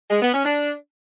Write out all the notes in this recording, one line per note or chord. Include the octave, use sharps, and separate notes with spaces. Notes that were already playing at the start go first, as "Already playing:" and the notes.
G#3
B3
C#4
D4